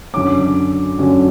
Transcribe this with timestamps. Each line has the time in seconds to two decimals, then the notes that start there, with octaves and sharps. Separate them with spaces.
0.14 F#2 D3 F#3 C#4 D6
0.99 F#2 D3 F#3 C#4